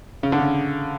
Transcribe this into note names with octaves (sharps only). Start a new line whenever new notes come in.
C#3
D3
C#3